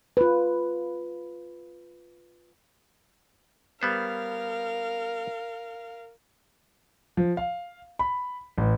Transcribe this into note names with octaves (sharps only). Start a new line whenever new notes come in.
F4 B4
G3 B3 A#4 C5 F5
F3
F5
B5
A1